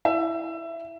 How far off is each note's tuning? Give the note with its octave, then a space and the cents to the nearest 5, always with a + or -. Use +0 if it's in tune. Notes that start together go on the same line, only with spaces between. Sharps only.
E4 +0 E5 +20